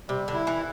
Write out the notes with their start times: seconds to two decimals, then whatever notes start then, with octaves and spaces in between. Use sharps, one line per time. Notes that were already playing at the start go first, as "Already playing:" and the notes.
0.08 C3 G3
0.28 D3
0.34 E4
0.47 E3